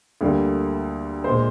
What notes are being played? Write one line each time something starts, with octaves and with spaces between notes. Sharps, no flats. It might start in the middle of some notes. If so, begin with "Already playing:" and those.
D2 D3 G3 A#3
A#2 G#3 C5